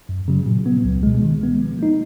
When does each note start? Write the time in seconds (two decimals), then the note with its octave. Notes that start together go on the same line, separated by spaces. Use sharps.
0.09 F#2
0.28 C#3 F#3
0.46 A#2
0.66 F#3 B3
0.84 C#2
1.03 B2 G#3
1.22 D#3
1.41 G#3 B3
1.60 F3
1.79 A#3 D#4